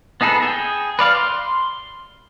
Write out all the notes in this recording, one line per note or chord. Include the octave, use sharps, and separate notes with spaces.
B3 D#4 G#4 A4 B4
G#4 G5
B4 D5 F5
C6